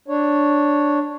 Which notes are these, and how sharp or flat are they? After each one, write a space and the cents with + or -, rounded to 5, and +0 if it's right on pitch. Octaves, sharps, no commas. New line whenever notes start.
D4 +0 C#5 +0